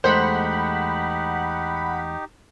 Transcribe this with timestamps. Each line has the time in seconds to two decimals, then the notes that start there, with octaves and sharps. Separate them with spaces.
0.04 E2 G#3 A3 D#4 G4 C5 F#5 B5